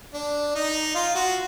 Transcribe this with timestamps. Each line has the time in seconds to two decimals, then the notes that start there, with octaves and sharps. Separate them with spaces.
0.14 D4
0.55 D#4
0.95 F4
1.15 F#4